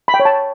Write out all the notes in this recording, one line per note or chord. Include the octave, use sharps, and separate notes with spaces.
B5
G5
C#5
A5